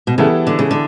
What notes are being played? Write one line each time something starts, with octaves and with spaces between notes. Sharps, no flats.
B2
C#3 E3 G3 B3 E4 A4
D3
C#3
D3